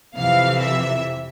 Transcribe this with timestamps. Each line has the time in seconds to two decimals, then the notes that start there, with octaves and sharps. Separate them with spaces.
0.17 F2 C3 E3 F5
0.61 E5